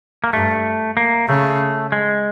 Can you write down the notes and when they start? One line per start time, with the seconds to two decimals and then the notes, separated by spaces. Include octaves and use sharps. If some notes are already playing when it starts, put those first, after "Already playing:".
0.24 A#3
0.33 G2 A3
0.97 A#3
1.28 C#3 A3
1.92 G#3